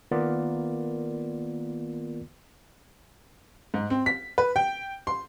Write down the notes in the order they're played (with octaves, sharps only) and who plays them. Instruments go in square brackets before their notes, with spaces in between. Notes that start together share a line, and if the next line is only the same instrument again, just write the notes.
[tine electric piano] D#3 A#3 B3 F4 A#4 D5
[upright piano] G#2
C4
B6
B4
G5
C6